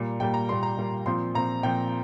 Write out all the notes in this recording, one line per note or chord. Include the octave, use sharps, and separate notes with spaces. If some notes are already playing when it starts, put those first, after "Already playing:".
Already playing: A#2 G3 A#3
A#2 G3 A#3 G5
A#5
A#2 G3 A#3 C6
A#5
A#2 G3 A#3
A#2 F3 C4 C6
A#2 F3 C4 A#5
A#2 F3 C4 G5